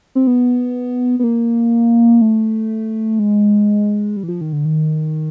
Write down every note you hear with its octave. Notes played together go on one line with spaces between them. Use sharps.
C4
B3
B3
A#3
A3
G#3
G3
E3
F3
D#3
D3
D#3